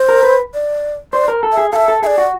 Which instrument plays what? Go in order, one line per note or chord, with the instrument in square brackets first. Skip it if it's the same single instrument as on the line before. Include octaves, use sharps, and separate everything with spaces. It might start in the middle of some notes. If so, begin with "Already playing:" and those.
Already playing: [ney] C5
[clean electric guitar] A#4
B4
[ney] D5
[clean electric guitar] C5 [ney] D5
[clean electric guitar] A#4
A4
[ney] E5
[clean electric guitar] G#4
[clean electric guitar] A4 [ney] E5 F5
[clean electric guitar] A4
[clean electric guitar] G#4 [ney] E5
[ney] D5
[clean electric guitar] F#4